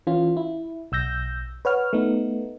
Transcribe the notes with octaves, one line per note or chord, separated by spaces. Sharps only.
E3 C#4 F4
E4
B1 E6 G6 A#6
B4 C#5 F#5 F6
A3 B3 D#4